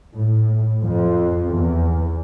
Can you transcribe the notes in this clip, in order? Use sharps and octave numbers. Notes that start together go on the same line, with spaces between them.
A2
F2
E2